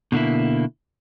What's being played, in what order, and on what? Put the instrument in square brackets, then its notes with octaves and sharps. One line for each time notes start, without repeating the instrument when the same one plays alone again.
[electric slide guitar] B2 D3 A#3 E4